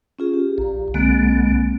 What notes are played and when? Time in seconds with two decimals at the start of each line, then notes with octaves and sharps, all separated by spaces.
0.19 C#4 F4 G#4
0.33 G4
0.58 A#1
0.94 B1 D3 G#3 A#3 C4